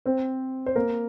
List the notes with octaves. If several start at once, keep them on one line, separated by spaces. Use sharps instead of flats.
C4 C5
C5
A#3 A#4